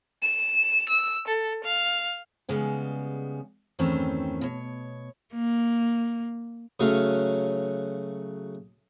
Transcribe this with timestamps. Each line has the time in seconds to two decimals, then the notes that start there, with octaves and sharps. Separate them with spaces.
0.23 E7
0.89 E6
1.28 A4
1.64 F5
2.49 C#3 G3 G#3 B3
3.79 E2 G2 D#3 A3 C4 C#4
4.41 B2 C#5
5.34 A#3
6.80 C#3 F#3 A3 C#4 F5